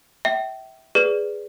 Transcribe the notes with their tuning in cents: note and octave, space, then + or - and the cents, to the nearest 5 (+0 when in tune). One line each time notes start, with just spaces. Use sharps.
E5 -15 G5 -30
G#4 +0 B4 +0 D5 +0